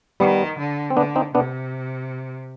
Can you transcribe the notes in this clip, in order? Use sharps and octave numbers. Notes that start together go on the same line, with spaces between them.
D#3 G3 B3
D3
C4
D3 B3 D4
C4 D#4
C3 B3 D4